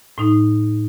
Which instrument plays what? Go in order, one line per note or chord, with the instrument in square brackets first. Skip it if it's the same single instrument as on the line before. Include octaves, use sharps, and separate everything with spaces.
[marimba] A2 D#4